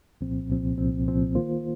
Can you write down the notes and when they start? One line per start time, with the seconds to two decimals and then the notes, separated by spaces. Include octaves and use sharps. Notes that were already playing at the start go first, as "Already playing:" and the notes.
0.21 C2 A#2 F3 C4
0.50 C2 A#2 F3 C4
0.78 C2 A#2 F3 C4
1.07 C2 A#2 F3 C4
1.35 D#3 A#3 F4 C5